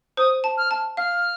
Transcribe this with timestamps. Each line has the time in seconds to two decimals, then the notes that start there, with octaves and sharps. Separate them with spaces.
0.17 C5 D#6
0.44 A5
0.57 F6
0.71 A5
0.97 F5 F6